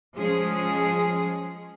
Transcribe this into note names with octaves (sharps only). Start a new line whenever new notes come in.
F3 G#3 C#4 G#4